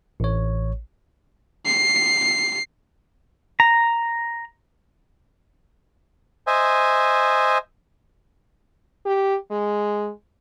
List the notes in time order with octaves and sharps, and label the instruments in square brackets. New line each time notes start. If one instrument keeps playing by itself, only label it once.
[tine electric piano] A1 C#5
[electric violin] C7
[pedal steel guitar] A#5
[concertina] C5 D#5 E5 G#5
[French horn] G4
G#3